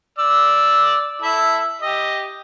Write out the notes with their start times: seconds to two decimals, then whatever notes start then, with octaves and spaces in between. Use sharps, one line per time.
0.18 D5 E6
1.22 E4 A4 E5
1.82 G4 D#5